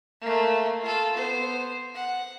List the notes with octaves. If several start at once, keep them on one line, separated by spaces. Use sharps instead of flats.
A3 A#3
F4 A4
B3 C5
F#5